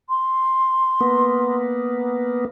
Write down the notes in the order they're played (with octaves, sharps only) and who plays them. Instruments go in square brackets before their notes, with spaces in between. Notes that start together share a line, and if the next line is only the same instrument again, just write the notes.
[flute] C6
[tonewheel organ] A#3 B3